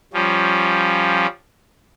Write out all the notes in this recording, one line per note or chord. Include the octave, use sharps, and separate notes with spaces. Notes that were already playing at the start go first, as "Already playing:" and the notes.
F3 G3 C#4